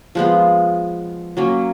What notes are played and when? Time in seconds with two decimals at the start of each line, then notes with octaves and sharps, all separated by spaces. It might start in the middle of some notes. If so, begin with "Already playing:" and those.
0.15 F3 G#3 B3 F4
1.37 F#3 A#3 C#4